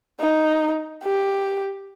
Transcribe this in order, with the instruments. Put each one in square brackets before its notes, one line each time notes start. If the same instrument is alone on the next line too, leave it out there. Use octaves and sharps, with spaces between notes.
[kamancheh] D#4
G4